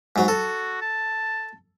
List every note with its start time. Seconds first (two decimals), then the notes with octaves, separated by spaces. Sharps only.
0.16 G#2 F#3
0.28 F#4 A4
0.82 A5